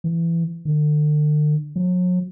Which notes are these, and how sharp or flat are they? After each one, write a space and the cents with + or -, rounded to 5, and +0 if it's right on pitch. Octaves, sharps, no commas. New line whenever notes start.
E3 +20
D3 +40
F#3 -40